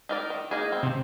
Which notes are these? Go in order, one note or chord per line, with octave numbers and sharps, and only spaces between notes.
D#4 A#4 D5
D#3
A#3 D#4 G#4
C4
C3